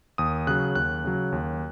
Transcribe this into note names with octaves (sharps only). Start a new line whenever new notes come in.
D#2 D#6
C#3 F#3 F#6
D#2 F#6
C#3 F#3
D#2